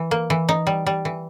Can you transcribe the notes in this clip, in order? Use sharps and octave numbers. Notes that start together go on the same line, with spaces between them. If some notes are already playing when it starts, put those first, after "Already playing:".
Already playing: E3
A#3
E3
D#4
G3
G3
E3